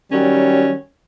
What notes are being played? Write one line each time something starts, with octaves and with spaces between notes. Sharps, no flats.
D#3 F#3 G3 C#4